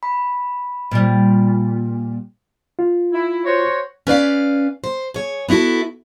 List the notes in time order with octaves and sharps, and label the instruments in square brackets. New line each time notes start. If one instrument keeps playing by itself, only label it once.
[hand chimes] B5
[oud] A#2 G3
[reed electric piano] F4
[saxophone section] E4
F#4 C5 C#5
[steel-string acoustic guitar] C#4 B4 D5 F5
C5
G#4 C#5
B3 D#4 E4 F#4 A4